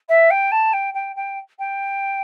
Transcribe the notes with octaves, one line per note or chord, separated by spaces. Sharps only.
E5
G5
A5
G5
G5
G5
G5